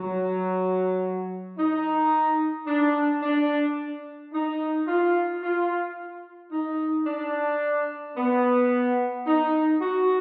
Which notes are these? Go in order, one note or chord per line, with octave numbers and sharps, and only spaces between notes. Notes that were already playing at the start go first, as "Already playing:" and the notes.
Already playing: F#3
D#4
D4
D4
D#4
F4
F4
D#4
D4
B3
D#4
F#4